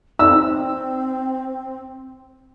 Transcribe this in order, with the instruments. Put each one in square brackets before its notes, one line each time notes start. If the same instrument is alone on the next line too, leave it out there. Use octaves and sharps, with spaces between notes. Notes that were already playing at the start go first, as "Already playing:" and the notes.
[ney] C4 [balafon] D#4 D5 [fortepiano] E6